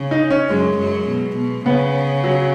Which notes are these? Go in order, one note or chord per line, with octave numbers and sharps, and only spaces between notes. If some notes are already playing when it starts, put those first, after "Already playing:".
Already playing: C#3
D#4
C#4
F#2 F#3 G#3
F#2 F#3
B2
B2
C#3 B3
F#3